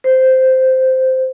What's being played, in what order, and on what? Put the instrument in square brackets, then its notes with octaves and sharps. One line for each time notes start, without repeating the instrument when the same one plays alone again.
[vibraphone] C5